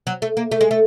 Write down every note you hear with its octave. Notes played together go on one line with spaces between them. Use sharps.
F#3
A3
A#3
A3
G#3
A3